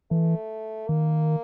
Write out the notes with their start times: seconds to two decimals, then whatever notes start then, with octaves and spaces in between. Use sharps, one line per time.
0.11 E3 A3
0.89 D#3 A#3